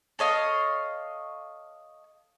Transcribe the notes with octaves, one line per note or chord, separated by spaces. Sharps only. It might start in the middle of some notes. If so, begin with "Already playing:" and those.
A4 C#5 D#5 F5